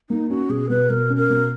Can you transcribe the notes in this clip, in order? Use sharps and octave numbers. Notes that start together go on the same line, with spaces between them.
A#3 D#4
C#4 F#4
B2 G#4
B2 B4
B2 A#4
C#4
A#4
B2